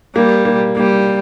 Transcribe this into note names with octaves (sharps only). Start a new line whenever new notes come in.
G3 A#3
A#3
G3 A#3